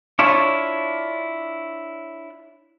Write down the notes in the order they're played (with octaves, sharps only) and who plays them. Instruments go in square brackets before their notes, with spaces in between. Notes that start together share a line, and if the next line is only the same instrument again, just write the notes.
[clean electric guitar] D4 E4 F4 C#5